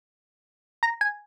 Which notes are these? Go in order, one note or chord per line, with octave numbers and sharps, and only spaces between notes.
A#5
G#5